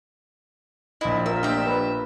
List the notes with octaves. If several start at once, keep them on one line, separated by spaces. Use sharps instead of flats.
A#1 E4 D#5
F4 A#4 E5 E6
A#3 D4 G4 E5
B4